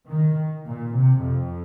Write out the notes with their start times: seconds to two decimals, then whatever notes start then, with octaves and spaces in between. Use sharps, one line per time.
0.08 D#3
0.66 A#2
0.94 C3
1.22 F2